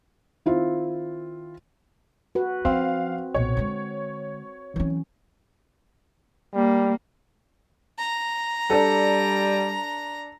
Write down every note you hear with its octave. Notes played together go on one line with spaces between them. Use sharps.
D#3 C4 E4 F4
F#4 B4
F3 C4 C#4 F5
B1 A#2 C#5
D3 G#3
E3 F#3 C4 C#4
G3 A#3
A#5
G3 D4 A4